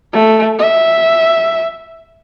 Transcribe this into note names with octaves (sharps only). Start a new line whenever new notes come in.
A3
E5